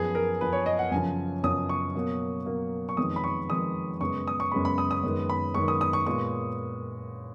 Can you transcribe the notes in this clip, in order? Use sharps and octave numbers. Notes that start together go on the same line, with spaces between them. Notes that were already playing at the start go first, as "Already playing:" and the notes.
Already playing: F#2 F3 B3 G#4
A#4
F#2 F3 B3 B4
C#5
D#5
F#5
F#2 C#3 F3 G#5
F#2 C#3 F3 D#6
C#6
B2 F#3 A#3
B2 F#3 A#3
C#6
F2 D#3 G#3 B3 D#6
B5
C#6
F2 D#3 G#3 B3 D#6
F#2 C#3 G#3 B3 C#6
D#6
C#6
F#2 C#3 G#3 B3 B5
B5
D#6
D#6
F#2 D#3 G#3 B3
B5
F#2 D#3 G#3 B3 C#6
D#6
D#6
C#6
A#2 G#3 B3 C#6